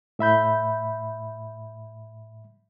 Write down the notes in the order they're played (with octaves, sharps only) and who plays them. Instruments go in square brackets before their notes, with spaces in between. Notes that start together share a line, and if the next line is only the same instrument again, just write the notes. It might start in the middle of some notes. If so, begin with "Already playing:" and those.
[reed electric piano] A2 E5 B5 G6